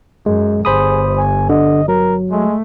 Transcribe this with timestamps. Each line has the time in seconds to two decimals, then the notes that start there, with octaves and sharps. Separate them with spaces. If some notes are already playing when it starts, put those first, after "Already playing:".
0.26 F#2 G#3
0.65 G1 G#4 C5 B5 D#6
1.17 G#5
1.49 D3 D#5
1.88 F#3 A#4
2.31 G#3 A3